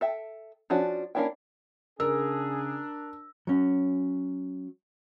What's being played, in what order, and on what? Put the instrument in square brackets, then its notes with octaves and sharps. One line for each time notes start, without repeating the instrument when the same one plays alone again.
[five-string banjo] A4 E5 G5
F3 C#4 D4 F#4
A#3 C#4 D4 E4 G5
[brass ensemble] C#3 G#4 [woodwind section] D4 [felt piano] A#4 [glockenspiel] E6
[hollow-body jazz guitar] F#3 C#4